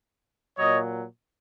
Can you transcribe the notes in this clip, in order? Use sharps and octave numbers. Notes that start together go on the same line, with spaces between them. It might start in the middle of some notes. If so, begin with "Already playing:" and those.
A#2 F#3 C#5 D#5